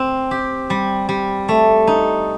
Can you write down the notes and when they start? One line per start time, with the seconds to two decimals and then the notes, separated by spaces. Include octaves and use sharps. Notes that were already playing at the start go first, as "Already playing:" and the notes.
Already playing: C4
0.31 G4
0.70 G3
1.09 G3
1.49 A3
1.87 D#4